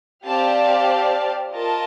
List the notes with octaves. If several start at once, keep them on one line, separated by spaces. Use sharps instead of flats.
C4 G4 D5 F5 A5
F4 A#4 D#5 A5